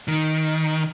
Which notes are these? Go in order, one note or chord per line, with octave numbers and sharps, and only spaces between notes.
D#3